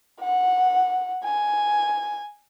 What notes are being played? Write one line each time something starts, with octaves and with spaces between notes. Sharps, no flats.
F#5
G#5